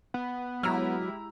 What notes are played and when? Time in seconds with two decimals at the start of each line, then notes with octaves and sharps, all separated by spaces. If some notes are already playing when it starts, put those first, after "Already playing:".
0.14 B3
0.63 F#3 G#3 E4 G4 A#5 E6 F6